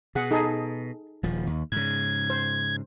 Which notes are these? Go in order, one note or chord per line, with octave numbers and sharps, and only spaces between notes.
B2 G#4 F#5
D#4 G#4 A4
D#1 F3
D#2
G#2 C#3 G#6
C5